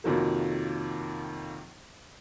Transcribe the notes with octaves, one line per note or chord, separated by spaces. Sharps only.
F2 C3 D#3 F#3 A#3